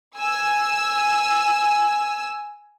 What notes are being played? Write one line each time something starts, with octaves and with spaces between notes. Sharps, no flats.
G#5 E6